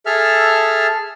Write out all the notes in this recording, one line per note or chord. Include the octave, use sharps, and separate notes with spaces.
G#4 A4 E5 A5 F6